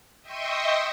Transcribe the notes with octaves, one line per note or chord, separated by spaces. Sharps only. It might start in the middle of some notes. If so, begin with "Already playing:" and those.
D#5 E5 G5 C6 C#6 D#6